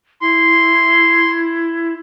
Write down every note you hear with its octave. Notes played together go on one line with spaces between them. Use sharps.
E4 C6